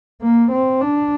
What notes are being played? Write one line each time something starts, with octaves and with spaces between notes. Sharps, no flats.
A#3
C4
D4